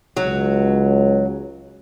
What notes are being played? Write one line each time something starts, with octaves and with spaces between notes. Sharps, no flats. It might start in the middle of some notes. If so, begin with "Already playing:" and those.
C#2 F#3